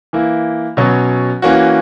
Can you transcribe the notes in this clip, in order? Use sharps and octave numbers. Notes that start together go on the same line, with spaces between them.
E3 A#3 E4
B2 F#3 C#4
E3 A#3 C#4 F#4